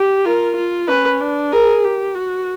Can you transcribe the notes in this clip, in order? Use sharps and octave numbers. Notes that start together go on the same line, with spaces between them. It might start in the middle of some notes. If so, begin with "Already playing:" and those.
Already playing: G4
F4 A#4
F4
C#4 B4
D4
G#4 A#4
G4
F#4